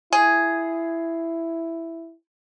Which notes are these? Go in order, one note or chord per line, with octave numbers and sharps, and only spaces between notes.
E4 G#4